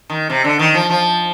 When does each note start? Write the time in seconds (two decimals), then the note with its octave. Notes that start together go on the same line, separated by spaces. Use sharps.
0.10 D#3
0.30 C3
0.44 D3
0.59 D#3
0.74 F3
0.90 F3